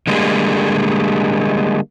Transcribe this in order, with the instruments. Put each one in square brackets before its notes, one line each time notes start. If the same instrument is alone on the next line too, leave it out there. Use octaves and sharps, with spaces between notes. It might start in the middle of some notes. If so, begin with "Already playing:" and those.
[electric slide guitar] D3 G3 G#3 A#3